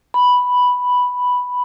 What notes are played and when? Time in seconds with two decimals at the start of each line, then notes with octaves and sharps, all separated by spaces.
0.14 B5